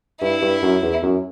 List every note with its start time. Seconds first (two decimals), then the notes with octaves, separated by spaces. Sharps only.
0.21 G2 E4
0.42 G2
0.62 F#2
0.82 E2
1.02 F#2